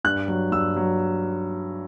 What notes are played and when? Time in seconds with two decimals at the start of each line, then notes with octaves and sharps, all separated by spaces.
0.04 G2 F#6
0.28 F#3
0.52 G2 E6
0.76 F#3